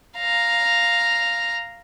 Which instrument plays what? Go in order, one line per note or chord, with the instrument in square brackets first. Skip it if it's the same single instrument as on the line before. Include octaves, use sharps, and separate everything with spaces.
[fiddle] F5 A#5